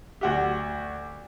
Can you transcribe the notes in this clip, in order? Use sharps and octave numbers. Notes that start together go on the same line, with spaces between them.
D2 F#4 G4